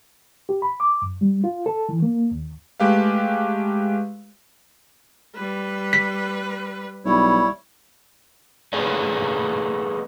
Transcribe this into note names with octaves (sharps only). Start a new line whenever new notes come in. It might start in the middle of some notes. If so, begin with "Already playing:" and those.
G4
B5
D6
F#2
G3
F4
A4
E3
A#3
D#2
G#3 A3 G4 B4 F5
G3 B4
B6
B1 G3 E4 C#5
B3 G#4 A4 B4 C#5 D#5